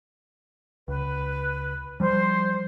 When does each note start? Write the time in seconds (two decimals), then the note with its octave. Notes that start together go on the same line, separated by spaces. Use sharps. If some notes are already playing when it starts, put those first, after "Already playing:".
0.88 C#2 B4
2.00 F3 G3 C5